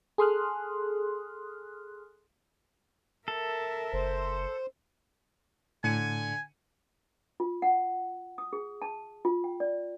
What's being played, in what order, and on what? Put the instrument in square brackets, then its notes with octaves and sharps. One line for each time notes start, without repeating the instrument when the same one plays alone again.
[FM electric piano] G#4 A4 C6 D#6 F6 F#6
[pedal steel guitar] A4 [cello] A#4 E5
[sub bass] F#1 [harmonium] C5
[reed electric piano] A2 [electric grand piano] D3 C#7 D#7 [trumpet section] G#5
[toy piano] F4
F#5
D#6
G#4
A5
F4
G5
D5